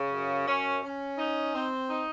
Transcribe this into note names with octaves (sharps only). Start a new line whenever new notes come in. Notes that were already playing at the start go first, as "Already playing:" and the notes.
Already playing: C#3
F#2
C#4
C#4
D#4
C4
D#4